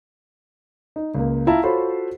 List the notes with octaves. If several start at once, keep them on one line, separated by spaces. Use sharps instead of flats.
D#4
C#2 A#3
E4 F4 F5 A5 A#5
F4 F#4 A4 C5 C#5 B5